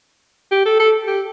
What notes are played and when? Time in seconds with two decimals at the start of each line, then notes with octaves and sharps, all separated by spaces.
0.52 G4
0.66 A4
0.79 A4
1.07 G4